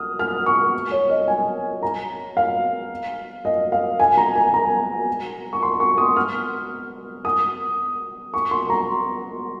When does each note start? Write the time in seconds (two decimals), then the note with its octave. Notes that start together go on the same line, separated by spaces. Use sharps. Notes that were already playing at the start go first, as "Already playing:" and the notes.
Already playing: D#6 F6
0.19 F6
0.46 C#6
0.92 C#5
1.10 D#5
1.28 G#5
1.83 A#5
2.37 F5
3.45 D#5
3.72 F5
4.00 G#5
4.17 A#5
4.35 G#5
4.54 A#5
5.53 C#6
5.63 C6
5.80 C#6
5.98 D#6
6.16 F6
7.25 D#6
8.34 C#6
8.51 C6
8.70 A#5